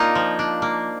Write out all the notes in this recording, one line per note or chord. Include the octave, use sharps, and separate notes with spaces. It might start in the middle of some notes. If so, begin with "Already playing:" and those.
Already playing: A#3 D4 D#4 F4
F3
D4
A#3